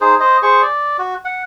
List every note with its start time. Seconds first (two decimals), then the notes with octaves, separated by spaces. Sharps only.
0.01 D#4 G#4 C5
0.20 C5 D#5
0.42 G#4 C5 C#6
0.62 D5
0.99 F#4
1.25 F#5